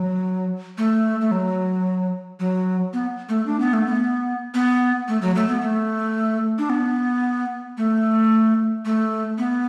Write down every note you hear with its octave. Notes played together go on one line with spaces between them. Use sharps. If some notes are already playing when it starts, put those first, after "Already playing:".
Already playing: F#3
A3
A3
F#3
F#3
B3
A3
D4
B3
A3
B3
B3
A3
F#3
A3
B3
A3
D4
B3
A3
A3
B3